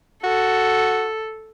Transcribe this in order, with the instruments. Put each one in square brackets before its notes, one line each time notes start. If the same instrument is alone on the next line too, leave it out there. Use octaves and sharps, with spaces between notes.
[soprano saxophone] F#4 [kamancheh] A4